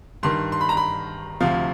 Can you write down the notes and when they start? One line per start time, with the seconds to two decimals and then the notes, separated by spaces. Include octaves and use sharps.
0.23 G2 D#3 C6
0.52 C6
0.61 B5
0.69 A#5
0.77 B5
1.40 D2 C3 F3 F5